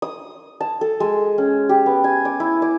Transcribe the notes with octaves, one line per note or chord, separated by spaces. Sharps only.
D#6
A5
A4
G#3
C#4
G4
B3
G#5
D6
E4
D6